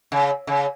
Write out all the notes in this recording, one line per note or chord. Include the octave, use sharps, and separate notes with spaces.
C#3
C#3